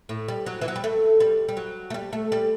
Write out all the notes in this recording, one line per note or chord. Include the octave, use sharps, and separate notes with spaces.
A2
G3
F#3
E3
F#3
G3
A3
G3
G3
F#3
A3
G3
A3
G3